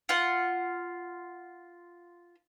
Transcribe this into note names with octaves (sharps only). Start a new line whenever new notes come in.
F4 F#5